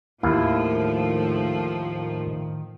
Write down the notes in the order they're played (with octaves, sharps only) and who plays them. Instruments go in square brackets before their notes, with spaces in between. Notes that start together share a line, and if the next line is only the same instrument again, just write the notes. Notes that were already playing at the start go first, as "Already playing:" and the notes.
[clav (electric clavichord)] D#2 E4 F5 [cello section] A2 F3 [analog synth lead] D#3